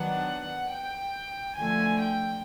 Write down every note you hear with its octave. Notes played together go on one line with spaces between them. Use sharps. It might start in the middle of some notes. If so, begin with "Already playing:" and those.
Already playing: D#3 F#3 B3 D4 F#5
G5
D3 F3 A3 G#5
G5